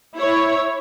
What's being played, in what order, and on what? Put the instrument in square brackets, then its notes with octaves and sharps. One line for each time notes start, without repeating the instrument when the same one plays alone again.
[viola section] E4 C#5